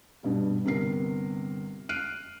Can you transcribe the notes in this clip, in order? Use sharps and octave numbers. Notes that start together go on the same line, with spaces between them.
G2 B2 G3
G1 C3 B3 A#4 C7
F6 F#6 C7 D7 D#7